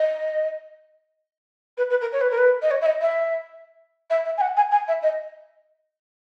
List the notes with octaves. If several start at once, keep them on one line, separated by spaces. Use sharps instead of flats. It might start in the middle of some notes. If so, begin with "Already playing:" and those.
Already playing: D#5
B4
B4
A#4
C#5
B4
A#4
B4
D#5
C#5
E5
D#5
E5
E5
E5
G#5
F#5
G#5
G#5
E5
D#5